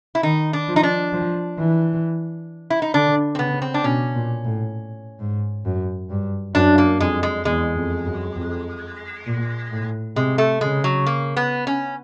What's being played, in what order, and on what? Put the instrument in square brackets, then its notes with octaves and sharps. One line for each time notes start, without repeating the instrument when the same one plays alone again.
[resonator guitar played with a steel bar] E4
[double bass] D#3 [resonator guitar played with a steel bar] D#4
[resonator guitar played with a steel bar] D4
[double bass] F3
[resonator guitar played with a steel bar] D#4
D4
[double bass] F3
E3
[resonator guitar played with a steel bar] E4
D#4
[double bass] D3 [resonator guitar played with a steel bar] D4
[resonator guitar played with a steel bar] C4
[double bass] C#3 [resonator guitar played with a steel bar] B3
[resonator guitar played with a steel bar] C4
D4
[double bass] B2 [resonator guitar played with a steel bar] C#4
[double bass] A#2
A2
G#2
F#2
G2
[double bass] F#2 [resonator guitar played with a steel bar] D4
[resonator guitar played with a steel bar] A#3
[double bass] F2 [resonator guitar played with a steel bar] G#3
[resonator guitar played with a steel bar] G#3
[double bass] E2 [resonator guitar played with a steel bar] G#3
[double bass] F2
F#2
F2
A#2
A2
[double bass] C3 [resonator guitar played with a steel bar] G#3
[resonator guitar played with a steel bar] A3
[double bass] C#3 [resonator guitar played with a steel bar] G#3
[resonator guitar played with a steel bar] F#3
A#3
B3
C#4